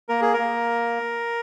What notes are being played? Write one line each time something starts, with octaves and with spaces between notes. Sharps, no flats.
A#3 A#4
G#4
A#4
A#3